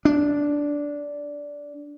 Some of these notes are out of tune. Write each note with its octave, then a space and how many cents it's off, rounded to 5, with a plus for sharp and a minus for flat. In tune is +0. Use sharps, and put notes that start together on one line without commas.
D4 -10